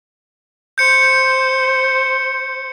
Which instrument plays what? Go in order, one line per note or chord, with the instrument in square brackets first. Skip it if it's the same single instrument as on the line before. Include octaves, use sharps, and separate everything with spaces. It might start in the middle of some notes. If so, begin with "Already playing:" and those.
[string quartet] C5 [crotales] G6 C#7